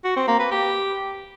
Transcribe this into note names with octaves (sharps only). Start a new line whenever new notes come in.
F#4
C4
A#3
B4
G4